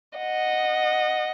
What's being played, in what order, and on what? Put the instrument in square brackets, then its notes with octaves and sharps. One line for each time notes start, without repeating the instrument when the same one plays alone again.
[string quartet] D#5 F#5